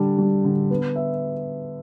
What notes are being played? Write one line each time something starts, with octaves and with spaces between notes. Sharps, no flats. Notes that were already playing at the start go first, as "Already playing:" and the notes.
Already playing: D3 G3 D4 G4
G3
D3
B3
E5